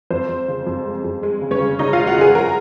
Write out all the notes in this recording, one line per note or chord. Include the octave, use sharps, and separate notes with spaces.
F2 C5
F2
C#3
F2
G#3
F2
G#3
C#3
C#4 C#5
C#3
C#3 D#4 D#5
F4 F5
G#3
F#4 F#5
C#3 G#4 G#5
F3 A#4 A#5